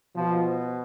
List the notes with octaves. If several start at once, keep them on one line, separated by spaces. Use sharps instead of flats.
B2 F3